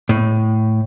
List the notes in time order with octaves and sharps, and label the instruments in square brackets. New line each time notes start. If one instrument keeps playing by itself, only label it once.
[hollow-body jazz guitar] A2